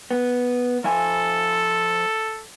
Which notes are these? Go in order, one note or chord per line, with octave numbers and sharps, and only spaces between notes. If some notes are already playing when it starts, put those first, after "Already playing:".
B3
F3 A4 E5 G#5